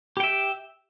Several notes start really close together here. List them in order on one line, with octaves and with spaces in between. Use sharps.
G4 G5 E5